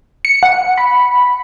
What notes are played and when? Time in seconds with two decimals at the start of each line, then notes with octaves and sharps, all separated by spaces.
0.25 C#7
0.43 F#5
0.78 B5